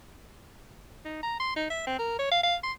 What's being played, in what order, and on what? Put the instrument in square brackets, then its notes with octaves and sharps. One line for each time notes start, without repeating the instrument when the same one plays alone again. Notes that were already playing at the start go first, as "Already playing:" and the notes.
[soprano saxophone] D#4
A#5
C6
D#4
E5
C4
A#4
C#5
F5
F5
C6